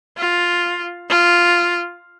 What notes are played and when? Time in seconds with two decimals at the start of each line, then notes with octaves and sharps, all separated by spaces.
0.18 F4
1.10 F4